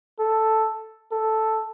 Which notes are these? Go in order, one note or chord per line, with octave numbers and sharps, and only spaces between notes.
A4
A4